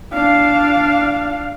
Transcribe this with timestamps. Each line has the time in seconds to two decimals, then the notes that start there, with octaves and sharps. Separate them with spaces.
0.14 D4 F5